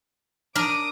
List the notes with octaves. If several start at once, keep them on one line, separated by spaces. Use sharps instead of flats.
D4 A#4 D6 D#6